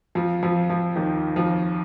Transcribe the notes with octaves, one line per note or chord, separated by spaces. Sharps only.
F2 F3
F2 F3
F2 F3
D#2 D#3
F2 F3